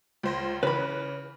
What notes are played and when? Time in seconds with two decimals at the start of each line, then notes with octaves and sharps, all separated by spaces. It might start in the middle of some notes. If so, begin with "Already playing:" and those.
0.23 C#2 C5 A#6
0.63 C#3 E3 B4 B5